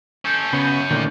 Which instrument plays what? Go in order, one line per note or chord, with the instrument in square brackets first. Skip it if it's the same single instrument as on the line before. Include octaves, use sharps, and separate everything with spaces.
[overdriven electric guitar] C#4 A4 [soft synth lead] G6
[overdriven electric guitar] F#2 C#4 [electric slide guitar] C#3 [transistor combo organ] B3
[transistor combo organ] A#2 D3 [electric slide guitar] D#3 A3